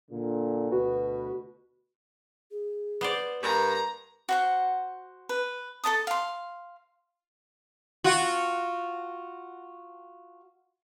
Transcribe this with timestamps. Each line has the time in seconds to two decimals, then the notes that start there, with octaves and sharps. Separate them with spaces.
0.11 A#2 D3
0.72 D2 B2 F#4 B4
2.51 G#4
3.01 B3 C5 D5
3.43 G2 A#4 A#5
4.29 F#4 C5 F#5
5.29 B4
5.84 A4 C5 A5 D#6
6.07 F5 C6
8.04 F4 F#4